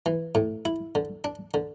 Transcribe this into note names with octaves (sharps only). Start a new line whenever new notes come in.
E3
A2
E4
D3
D4
D3